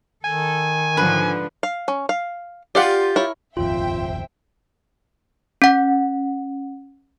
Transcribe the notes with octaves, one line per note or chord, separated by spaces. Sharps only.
D#3 A4 G#5
G#2 D3 F3 B4
F5
C#4
F5
F4 G4 D5 F5 F#5
E4 A#4 C#5
D#1 G#1 F2 F4 C5 E5 G5
C#4 F#5